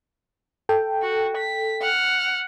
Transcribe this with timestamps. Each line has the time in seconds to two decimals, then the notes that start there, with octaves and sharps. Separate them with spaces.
0.69 A4 G5
1.02 F#4
1.37 B6
1.81 F#5 F6